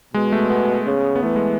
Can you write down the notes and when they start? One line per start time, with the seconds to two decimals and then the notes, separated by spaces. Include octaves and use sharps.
0.14 B2 G#3
0.32 A3
0.50 B3
0.86 C#3
1.15 B3
1.23 E3 A3
1.36 G#3